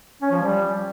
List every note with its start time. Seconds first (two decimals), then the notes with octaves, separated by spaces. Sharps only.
0.22 C#4
0.32 F3
0.42 G3